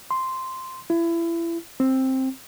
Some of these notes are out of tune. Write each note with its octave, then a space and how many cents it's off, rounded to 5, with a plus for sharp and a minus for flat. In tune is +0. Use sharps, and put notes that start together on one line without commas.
C6 -5
E4 +30
C4 +10